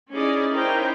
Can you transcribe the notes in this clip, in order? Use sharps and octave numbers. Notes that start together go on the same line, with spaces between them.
C#4 D#4 E4 G#4 D5 D#5
C#4 D#4 E4 A#4 C5 G5